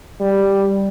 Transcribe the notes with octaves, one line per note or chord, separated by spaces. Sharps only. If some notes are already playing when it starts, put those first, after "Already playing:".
G3